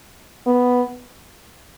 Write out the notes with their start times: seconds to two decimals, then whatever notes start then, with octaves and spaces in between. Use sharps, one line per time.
0.47 B3